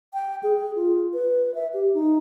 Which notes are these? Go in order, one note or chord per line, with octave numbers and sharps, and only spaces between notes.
G5
G#4
F4
B4
E5
G4
D#4